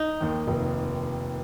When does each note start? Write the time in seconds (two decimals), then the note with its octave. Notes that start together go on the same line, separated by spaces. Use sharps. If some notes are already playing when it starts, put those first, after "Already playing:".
Already playing: D#4
0.20 D#2 D#3
0.48 F1